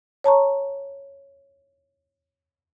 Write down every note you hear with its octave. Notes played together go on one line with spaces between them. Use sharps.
C#5 A5 A#5 C#6